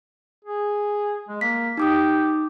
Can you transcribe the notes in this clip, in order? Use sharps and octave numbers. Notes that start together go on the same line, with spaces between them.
G#4
G#3
A#3 B6
D#4 G4 D6 D#6